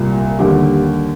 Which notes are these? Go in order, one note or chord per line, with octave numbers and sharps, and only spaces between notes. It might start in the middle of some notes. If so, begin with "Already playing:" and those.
Already playing: C2 A#2 G3
D#2 D3 G3 G4